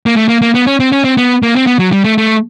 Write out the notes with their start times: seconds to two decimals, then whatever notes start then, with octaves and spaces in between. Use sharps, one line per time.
0.06 A#3
0.16 A3
0.28 A#3
0.42 A#3
0.55 B3
0.66 C#4
0.80 C4
0.92 C#4
1.04 C4
1.17 B3
1.43 A#3
1.56 C4
1.67 B3
1.79 F#3
1.92 G3
2.04 A3
2.18 A3